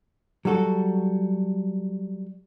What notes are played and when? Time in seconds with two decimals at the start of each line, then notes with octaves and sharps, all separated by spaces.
0.45 F#3 G3 F#4 A4